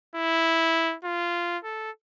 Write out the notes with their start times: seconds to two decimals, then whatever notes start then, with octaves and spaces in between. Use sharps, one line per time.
0.16 E4
1.05 F4
1.64 A4